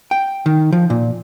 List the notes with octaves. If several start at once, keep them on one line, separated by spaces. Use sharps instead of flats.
G5
D#3
F3
A#2